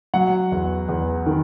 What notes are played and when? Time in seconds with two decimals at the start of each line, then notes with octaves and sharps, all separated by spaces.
0.14 F#3 F#5
0.51 E2
0.88 E2
1.26 D#3